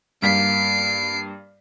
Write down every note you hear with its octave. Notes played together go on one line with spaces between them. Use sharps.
G2 A#3 B6 C7 D7